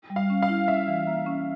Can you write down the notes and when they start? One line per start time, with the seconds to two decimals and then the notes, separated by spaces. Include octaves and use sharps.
0.10 G3
0.16 F5
0.30 C#4
0.42 F5
0.49 E4
0.68 C#4 E5
0.88 E3
1.07 A#3
1.26 C#4